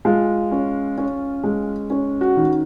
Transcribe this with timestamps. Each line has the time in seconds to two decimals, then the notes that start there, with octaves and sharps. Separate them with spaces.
0.05 G#3 F4
0.51 C#4
0.98 C#4
1.44 G#3
1.90 C#4
2.21 F#4
2.37 D#3